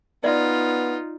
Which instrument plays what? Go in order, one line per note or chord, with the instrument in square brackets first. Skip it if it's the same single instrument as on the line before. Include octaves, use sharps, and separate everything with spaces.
[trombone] B3 [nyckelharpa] D#4 F4 [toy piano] D5 E5